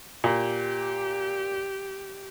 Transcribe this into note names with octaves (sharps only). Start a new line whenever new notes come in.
A#2 G4